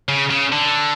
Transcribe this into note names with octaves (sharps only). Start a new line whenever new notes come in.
C#3
C#3
D3